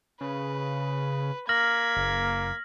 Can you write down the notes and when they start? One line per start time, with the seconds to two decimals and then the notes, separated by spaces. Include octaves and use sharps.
0.21 C#3 B4
1.49 A#3 F6 G#6 A#6 B6 F#7
1.96 F#1